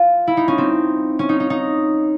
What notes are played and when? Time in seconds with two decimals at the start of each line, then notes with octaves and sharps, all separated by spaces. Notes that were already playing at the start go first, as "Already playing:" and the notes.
Already playing: F4
0.27 E4
0.37 D#4
0.48 C#4
0.58 C4
1.19 C#4
1.29 D#4
1.40 D#4
1.50 D#4